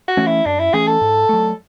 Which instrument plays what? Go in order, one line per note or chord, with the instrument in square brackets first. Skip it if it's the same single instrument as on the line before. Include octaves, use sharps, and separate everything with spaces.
[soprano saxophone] F#4
[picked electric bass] E3 A3 C#4
[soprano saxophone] E4
[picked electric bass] F#2 [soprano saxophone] D4
[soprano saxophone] E4
[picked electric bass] E3 A3 C#4 [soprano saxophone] G#4
[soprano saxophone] A4
[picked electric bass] G#2
F#3 A3